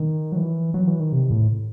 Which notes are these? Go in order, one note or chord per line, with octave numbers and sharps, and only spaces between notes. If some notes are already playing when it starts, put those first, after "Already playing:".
Already playing: D#3
F#3
E3
F#3
E3
D#3
C3
A2